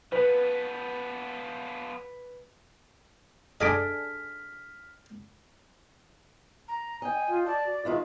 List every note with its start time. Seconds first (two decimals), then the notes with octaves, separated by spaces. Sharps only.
0.12 F3 B3 B4
3.61 D4 G#4 A4 D#5 G#5 D6 F6 B6
6.68 A#5
7.02 D#5 G5 G#5
7.28 F4
7.46 D5 A5
7.66 F#4
7.85 D#3 G#3 E4 F4